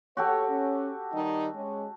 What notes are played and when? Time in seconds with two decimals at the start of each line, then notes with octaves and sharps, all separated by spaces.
0.17 F#4 G4 A4 C#5
0.49 C#4
1.14 D#3 G3 D#4
1.54 G#3 C#4